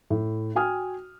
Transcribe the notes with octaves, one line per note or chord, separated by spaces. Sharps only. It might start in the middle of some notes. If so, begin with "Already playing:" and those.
A2
F#4 G5 G#5 D#6 F6